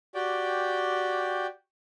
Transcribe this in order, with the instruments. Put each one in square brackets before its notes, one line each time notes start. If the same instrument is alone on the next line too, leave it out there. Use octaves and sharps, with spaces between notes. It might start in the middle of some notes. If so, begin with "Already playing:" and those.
[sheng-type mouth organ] F#4 G4 D5 G5